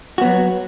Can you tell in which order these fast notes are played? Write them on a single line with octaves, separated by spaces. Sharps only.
F#4 B3 F#3